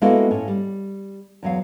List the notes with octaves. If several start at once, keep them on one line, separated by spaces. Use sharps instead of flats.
G#3 A#3 B3 E4 F#4 A4
A2 C#4
G3
E2 F#3 F5